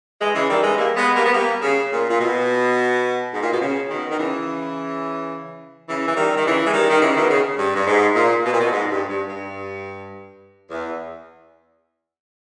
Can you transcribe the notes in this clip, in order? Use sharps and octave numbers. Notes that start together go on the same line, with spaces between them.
E3 G#3
C#3 E3
D#3 G3
E3 G#3
G3 A#3
G#3 B3
G3 A#3
B3
G3 A#3
C#3
A#2
A#2
B2
G#2
A#2
B2
C#3
B2 D#3
D#3
C#3 E3
C#3 E3
E3
D#3 G3
D#3
C#3 E3
G#3
D#3 G3
D#3
C#3 E3
B2 D#3
C#3
G2
G2
G#2
A#2
B2
A#2
B2
G#2
G2
G2
G2
E2